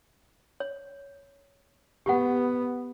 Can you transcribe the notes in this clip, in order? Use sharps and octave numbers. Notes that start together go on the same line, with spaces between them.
C#5
B3 G4 F#5